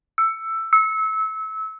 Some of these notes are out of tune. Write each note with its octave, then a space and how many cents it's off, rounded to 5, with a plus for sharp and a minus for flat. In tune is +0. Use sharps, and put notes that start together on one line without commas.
E6 +10
E6 -25